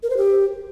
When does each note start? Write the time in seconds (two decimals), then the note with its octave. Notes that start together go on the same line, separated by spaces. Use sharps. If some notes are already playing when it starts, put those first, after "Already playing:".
0.03 A#4
0.10 C5
0.17 G4